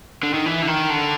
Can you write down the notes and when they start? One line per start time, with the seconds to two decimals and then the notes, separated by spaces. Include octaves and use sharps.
0.23 D3
0.34 D#3
0.46 E3
0.62 D3
0.67 D#3
0.90 D3